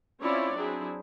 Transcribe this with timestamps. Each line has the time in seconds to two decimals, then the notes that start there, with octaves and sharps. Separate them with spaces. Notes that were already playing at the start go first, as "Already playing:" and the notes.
0.22 C4 C#4 E4 F4 C#5 D5
0.55 F#3 C4 D4 E4 G#4